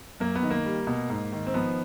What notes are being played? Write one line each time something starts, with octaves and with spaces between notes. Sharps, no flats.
F#2 A#3
B3
D#3
A#3
G3
B2
G#2
D#3
C4
F3 B3